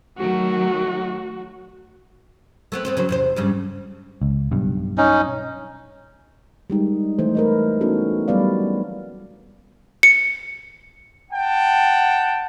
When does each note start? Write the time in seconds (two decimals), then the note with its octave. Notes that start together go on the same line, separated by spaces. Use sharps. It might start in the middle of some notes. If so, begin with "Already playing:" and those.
0.18 D#3 F#3 A3 F#4
2.72 A3 B3 C4
2.85 B3 C4 C5
2.97 C#3 F#3 C5
3.09 E2 C3 C5
3.36 G2 C#3 G3
4.22 C#2
4.51 B1 G2
4.98 C#4 D#4
6.70 G3 G#3 D#4
7.18 E3 G#3 A3 C5
7.35 A#4 B4 D#5
7.81 B3 C#4 D#4 E4 F#4 A4
8.28 F#3 G3 B3 B4 D5 F5
10.03 C#7
11.31 F#5 G5 A5